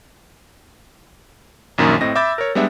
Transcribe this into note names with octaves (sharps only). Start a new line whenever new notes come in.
A#1 F#2 D#3 A#3 D#6
A2 C4 D#5 A#6
E5 B5 D6 E6 G6 A6
A#4 C#5
G3 G#3 B3 D4 E5